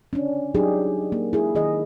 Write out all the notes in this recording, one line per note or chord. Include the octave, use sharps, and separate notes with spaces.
C#4 D4
F#3 D4 D#4 G4 G#4
A#3
E4 G#4
D#3 G#4 D#5